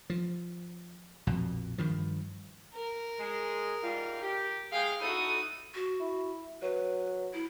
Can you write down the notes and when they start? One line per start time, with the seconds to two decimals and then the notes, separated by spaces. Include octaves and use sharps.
0.10 F3
1.27 A#1 F2 B2
1.78 G2 D#3 F3
2.74 A#4
3.19 G#3
3.82 G#2 G3 F4
4.22 G4
4.72 G#3 G#4 F5 G5
5.01 D#4 E4 F#4 A4 D#6
5.75 F#4
6.00 E4
6.62 F#3 B4
7.33 E4